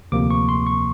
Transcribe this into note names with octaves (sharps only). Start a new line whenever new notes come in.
D2 C3 F3 A#3 D6
C#6
C6
C#6